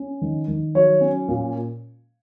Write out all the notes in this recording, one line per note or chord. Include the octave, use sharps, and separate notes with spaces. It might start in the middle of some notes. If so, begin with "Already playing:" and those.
Already playing: C#4
D#3
D#3
F#3 C#5
C#4
A#2